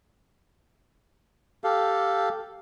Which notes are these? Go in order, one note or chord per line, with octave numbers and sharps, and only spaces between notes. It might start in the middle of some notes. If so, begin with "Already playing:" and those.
G4 A4 F5